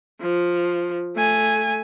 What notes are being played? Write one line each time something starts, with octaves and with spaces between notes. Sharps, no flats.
F3
A3 G#5